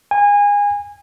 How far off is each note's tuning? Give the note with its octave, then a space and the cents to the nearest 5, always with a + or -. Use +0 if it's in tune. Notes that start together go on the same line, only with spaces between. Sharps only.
G#5 -25